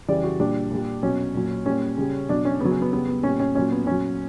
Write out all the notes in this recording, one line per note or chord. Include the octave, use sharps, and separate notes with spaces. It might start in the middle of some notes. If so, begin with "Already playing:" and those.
C#3 E3 G3 D5
F#4
A#2 G3 D4
A#2 G3
B2 F#3 C#4
A#2 F#3
A#2 G3 C#4
C#3 G3
B2 F#3 D4
C#4
C#3 F#3 B3
C#4
B3
C#3 G3 B3
B3
A#2 G3 C#4
C#4
A#2 F#3 C#4
B3
A#2 F#3 C#4